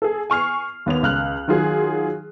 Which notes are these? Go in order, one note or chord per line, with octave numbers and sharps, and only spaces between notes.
G#4 A4
G#5 C#6 F6 C7
D#2 B3 C#5 F7
C#2 F6 F#6
D#3 F#3 F4 G#4